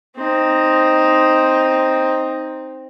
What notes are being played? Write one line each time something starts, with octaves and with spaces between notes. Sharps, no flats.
C4 D#4